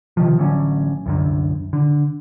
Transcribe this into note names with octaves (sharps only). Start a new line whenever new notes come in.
C3 D#3 F3
A1 D3 F#3 C#4
C2 F#2 D3
D3